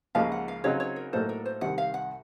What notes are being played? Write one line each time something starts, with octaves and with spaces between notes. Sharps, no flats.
C#2 C#3 F3 A#3 D#4 F5
F#5
F5
C#3 F#3 C4 D#4 C#5
C#5
A#4
A2 F#3 A#3 D#4 A4 C5
A#4
C5
C2 C3 D#3 F#5
F5
F#5